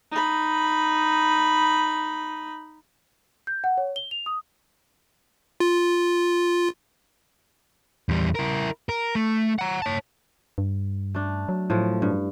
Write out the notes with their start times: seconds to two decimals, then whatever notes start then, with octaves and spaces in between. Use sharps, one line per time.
0.11 D#4 B5
3.47 G6
3.64 F#5
3.78 C#5
3.96 G7
4.11 F7
4.26 D#6
5.60 F4
8.09 E2 G3
8.35 E4 A#4
8.89 A#4
9.15 A3
9.59 F#5 A#5
9.82 C#5 A5
10.58 G2
11.15 A3 D4
11.49 F#3
11.70 A2 F3
12.02 G2